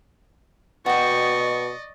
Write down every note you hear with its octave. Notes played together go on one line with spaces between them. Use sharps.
B2 F#4 D5 D#5 G5 C#6